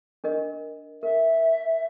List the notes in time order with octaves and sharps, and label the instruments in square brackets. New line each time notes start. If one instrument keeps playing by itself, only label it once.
[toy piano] D4 A#4 D#5
[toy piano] A#4 [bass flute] E5